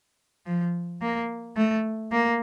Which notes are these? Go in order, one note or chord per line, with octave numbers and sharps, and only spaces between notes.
F3
A#3
A3
A#3